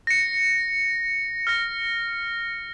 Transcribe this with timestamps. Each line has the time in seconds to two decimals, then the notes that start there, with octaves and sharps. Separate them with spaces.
0.07 A#6 C#7
1.47 F6 A#6